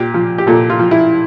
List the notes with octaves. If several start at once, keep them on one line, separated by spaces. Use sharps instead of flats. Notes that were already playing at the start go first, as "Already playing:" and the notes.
Already playing: A#2 G4
F3
G4
A#2 A4
F4
F3
E4